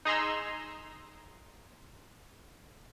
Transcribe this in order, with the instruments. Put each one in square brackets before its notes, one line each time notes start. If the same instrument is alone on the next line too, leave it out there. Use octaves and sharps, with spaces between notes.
[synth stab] D#4 G#4 A#5 C6 E6